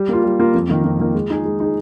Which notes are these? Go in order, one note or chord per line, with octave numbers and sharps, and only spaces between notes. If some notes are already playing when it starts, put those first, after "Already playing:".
Already playing: G3
A#3 F4
G3
A#3 F4
F2
D#3 A#3
F2
D#3 A#3
G#3
D#4 G#4
G#3
D#4 G#4